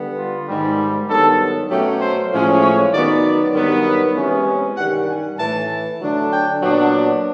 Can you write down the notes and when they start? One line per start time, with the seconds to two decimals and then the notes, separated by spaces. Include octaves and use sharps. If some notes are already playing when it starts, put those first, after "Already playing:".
Already playing: D3 G3 B3
0.18 F4
0.48 G#2 D#3 G3
1.09 G2 D#3 F#3 B3 A4
1.70 B2 F#3 A3 C#4 G4
2.01 C5
2.32 A2 F3 G#3 C#4
2.62 C#5
2.93 D#3 F#3 B3 D5
3.24 D5
3.54 G2 D#3 F#3 B3
4.16 C3 E3 G#3 C#4
4.77 G2 D#3 G3 F#5
5.08 G#5
5.39 A2 E3 A3 A5
6.00 D3 F#3 A3 D4
6.30 G5
6.62 A#2 F#3 B3 D4